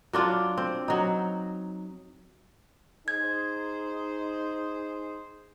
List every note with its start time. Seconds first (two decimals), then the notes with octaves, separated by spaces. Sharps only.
0.13 F#3 D4 F4
0.57 C4
0.88 F#3 D#4
3.08 D#4 G#4 C5 G#6